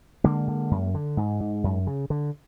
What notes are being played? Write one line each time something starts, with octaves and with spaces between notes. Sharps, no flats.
D3 G#3 A#3
D3
F#2
D3
G#2
G#2
F#2
C#3
D3